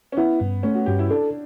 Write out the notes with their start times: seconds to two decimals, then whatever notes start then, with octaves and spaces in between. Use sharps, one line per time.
0.12 C#4
0.17 B3 E4
0.41 G2
0.63 A3 C#4
0.75 F#4
0.86 G2 G4
0.99 E4
1.10 D4 A4